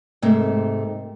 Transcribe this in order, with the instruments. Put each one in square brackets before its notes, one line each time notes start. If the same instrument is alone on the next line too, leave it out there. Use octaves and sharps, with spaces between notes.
[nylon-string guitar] G#2 C3 A3 A#3